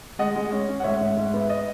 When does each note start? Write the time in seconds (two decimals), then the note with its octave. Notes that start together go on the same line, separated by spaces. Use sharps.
0.19 G#3 D#5 F#5
0.35 G#3
0.51 C#4
0.68 C#4
0.80 F#5
0.84 G#2 C#5 E5
1.01 G#2
1.17 G#2
1.34 B3
1.40 E5
1.49 D#5